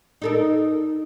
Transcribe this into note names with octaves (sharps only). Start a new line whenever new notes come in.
D#4 A4 A#4